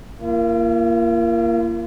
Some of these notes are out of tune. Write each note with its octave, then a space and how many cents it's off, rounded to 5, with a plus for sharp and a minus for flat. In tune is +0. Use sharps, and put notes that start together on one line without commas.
A#3 +0 F4 -45